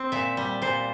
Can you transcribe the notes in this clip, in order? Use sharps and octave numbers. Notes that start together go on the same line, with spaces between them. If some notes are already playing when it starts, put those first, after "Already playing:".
Already playing: C4
A#2 E5
G3
A#2 C5